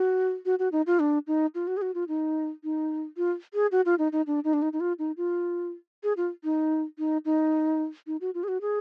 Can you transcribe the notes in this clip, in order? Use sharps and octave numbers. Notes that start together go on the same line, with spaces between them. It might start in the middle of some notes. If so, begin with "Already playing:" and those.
Already playing: F#4
F#4
F#4
D#4
F4
D4
D#4
F4
F#4
G#4
F#4
F4
D#4
D#4
F4
G#4
F#4
F4
D#4
D#4
D4
D#4
D4
D#4
D#4
F4
D#4
F4
G#4
F4
D#4
D#4
D#4
D#4
F#4
F4
G#4
F#4
G#4